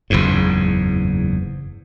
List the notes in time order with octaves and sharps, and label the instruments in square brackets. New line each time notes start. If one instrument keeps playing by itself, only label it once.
[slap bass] F#1 E2 G#2